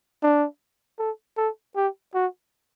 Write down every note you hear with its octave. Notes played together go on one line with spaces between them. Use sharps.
D4
A4
A4
G4
F#4